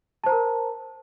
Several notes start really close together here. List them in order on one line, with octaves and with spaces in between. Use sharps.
A5 C5 A#5 A#4